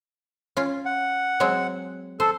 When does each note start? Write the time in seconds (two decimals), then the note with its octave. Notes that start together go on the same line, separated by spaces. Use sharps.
0.57 C#4 F4
0.86 F#5
1.40 F#3 G#3 C4
2.20 A4 C5